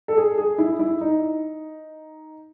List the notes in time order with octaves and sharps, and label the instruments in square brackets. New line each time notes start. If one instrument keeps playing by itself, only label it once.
[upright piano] A4
G#4
G#4
E4
E4
D#4